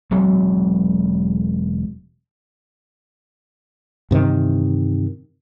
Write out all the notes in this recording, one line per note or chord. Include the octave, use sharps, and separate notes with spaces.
E1 F#3 G#3 C4
G2 C3 D#3 E3